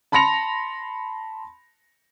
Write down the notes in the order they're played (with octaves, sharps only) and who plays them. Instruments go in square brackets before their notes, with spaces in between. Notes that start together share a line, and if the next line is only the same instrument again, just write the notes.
[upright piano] A5 B5 C6 A#6 C#7 F7